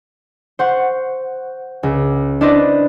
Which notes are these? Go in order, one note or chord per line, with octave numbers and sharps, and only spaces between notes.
C5 F#5 C#6
C#2
D4 E4 B4 C5 D5 D#5